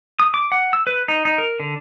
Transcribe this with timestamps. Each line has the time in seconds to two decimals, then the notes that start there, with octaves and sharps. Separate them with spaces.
0.20 D#6
0.34 D6
0.52 F#5
0.73 E6
0.87 B4
1.08 D#4
1.25 D#4
1.38 A#4
1.60 D3